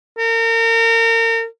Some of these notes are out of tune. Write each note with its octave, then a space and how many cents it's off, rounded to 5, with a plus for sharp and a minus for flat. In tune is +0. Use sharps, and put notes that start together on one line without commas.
A#4 -35